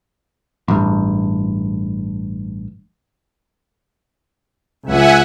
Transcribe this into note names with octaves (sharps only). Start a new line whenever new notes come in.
A1 G2
C#2 E5 F#5 G#5